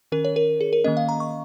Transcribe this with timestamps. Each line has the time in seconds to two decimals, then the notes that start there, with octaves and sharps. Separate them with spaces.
0.12 D#3 C#4 A#4
0.25 C#5
0.36 A#4
0.61 G#4
0.73 A#4
0.84 D#3 A#3 C#4 D#5
0.97 F5
1.09 A#5
1.20 C#6